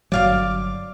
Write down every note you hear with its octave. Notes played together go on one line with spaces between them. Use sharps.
G1 C#2 F#3 D5 F5 D6